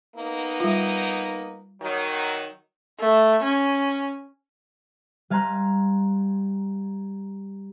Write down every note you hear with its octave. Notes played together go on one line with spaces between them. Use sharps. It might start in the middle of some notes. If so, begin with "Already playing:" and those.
A#3 B3 D#4
G3 F4
D#3 F#3
A3
C#4
G3 F5 G#5 A#5 C6 F#6